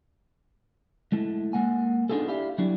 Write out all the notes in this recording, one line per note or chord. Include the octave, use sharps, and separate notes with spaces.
G#3 A3 E4
G#3 A#3 F#5 G#5
B3 D4 D#4 F4 G#4 A4
E4 G4 D5 F5
F#3 G3 D4 E4